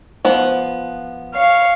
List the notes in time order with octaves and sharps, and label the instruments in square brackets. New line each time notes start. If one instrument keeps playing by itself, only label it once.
[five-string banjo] F3 B3
[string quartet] C#5 F5